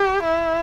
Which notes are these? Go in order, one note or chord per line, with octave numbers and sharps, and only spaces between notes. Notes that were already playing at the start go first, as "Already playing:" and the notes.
Already playing: G4
E4